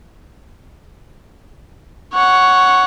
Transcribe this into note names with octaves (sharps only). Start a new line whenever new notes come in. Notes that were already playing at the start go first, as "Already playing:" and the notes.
C#5 F#5